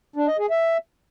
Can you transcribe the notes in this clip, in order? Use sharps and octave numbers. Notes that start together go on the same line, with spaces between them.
D4
D#5
G#4
E5